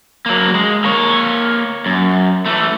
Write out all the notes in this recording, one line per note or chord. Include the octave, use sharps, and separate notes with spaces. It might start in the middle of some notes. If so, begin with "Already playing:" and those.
F#3 A#3
G#3
A#3 C#5
F#2
E3 A3